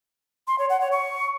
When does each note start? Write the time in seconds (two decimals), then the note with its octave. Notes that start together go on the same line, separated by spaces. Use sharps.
0.47 C6
0.58 C#5
0.69 F#5
0.81 C#5
0.92 C#6